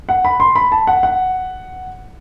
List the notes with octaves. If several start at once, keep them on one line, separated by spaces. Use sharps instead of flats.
F#5
B5
C6
B5
A5
F#5
F#5